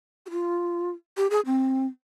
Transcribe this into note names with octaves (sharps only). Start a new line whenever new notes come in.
G4
F4
G4
G#4
C4